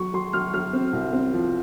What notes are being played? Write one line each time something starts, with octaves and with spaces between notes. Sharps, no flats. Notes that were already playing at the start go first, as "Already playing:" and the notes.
Already playing: F#3 C#6
F#3 C6
F#3 F6
F#3 F6
C4
C2
C4
F3